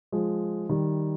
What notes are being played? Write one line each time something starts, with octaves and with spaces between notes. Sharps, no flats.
F3 G#3
D#3 G3